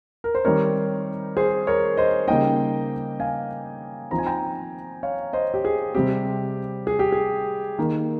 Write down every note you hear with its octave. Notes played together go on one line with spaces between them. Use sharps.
A#4
C5
D#3 G3 C4 D#4 A#4 C#5
G#4 C5
A#4 C#5
C5 D#5
C#3 G3 A#3 D#4 D#5 G5
F5 G#5
F3 C4 D#4 A#5
G#5
G5 A#5
C#5 F5
C5 D#5
G4
G#4
C3 G3 C4 G4
G#4
G4
G#4
D#3 A#3 D#4